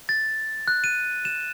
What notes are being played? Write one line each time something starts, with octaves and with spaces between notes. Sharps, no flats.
A6
F#6
D#7
E7